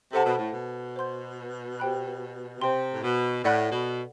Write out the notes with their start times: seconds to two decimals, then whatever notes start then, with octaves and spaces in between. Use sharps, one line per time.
0.13 C3 A4 C5 F#5 A5
0.26 B2
0.38 A2
0.51 B2
0.96 C5 F#5 C6 G6
1.79 G4 C5 G5 B5 F#6
2.61 C3 C5 G5 C6
2.93 A2
3.03 B2
3.44 A2 A4 D5 F#5 B5 F#6
3.72 B2